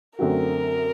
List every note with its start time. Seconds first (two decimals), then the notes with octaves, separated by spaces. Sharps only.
0.19 F#2 D3 A3 C4 F#4 A#4